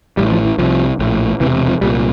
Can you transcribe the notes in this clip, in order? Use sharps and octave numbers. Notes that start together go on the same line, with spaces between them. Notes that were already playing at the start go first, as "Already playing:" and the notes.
A1 A2 G3
F3
E3
C2 C3 F3
A#1 A2
E1 D2 C3 E3
F3
C2 A#2 G3